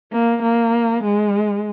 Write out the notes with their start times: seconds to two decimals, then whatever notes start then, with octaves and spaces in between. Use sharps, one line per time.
0.12 A#3
0.42 A#3
1.03 G#3